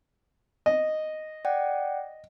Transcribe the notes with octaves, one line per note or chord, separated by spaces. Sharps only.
D#5
D5 F#5 G5